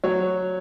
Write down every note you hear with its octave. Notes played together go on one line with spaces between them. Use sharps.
F#3 C#5